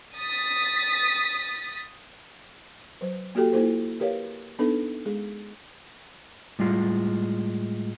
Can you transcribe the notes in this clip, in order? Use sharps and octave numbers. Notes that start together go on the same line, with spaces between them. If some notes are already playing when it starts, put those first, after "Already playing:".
D#6 A6 B6
F#3 B4 C5
A#3 F#4 G4 A4 G5
A#3 E4 F4 A4 C5
G4 A#4 B4 C#5 F5
B3 D4 D#4 A4 B4
G#3 G#4
A2 G3 G#3 F4